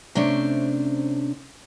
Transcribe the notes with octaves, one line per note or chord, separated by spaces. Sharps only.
C3 A3 C#4 D4 C5